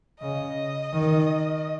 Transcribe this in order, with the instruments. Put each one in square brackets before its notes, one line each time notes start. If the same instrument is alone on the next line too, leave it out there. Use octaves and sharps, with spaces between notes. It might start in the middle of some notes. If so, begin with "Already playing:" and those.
[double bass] C#3 [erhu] D#5
[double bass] D#3